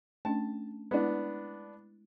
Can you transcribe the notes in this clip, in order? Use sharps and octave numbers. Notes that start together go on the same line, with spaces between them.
A3 C#4 D4 A5
G#3 B3 D4 E4